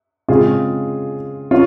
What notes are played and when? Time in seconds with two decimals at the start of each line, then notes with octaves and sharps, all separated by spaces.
0.28 C#3 G#3 C4 F4 G#4
1.51 C#4 F4